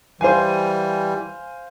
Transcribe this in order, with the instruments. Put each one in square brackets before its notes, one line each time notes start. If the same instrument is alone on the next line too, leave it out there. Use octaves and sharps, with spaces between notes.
[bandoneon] E3 G3 [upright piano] C5 F5 G#5